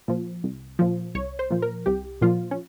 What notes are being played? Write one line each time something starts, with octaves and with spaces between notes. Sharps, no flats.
A#2 F3
C2
A#2 F3
C2 C#5
C5
A#2 F3
A#4
C2 G4
A#2 F3 F4
C#4